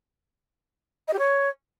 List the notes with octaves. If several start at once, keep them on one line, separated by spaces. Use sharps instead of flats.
D#5
G4
C#5